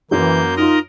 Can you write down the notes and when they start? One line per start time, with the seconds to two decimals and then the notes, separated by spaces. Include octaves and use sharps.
0.11 F#2 E3 F#3 A#3 G6
0.57 D#4 F4 A#4 D#5